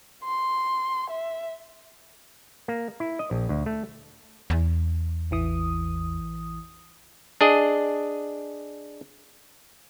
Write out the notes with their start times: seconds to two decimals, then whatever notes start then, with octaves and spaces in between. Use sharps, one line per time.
0.25 C6
1.10 E5
2.68 A#3
3.00 E4
3.19 D#5
3.31 A#1
3.49 D2
3.66 A3
4.50 E2
5.31 A1 E3 D#6
7.41 D4 G#4 D#5